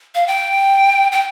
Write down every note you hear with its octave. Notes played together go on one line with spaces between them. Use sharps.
F5
G5
G5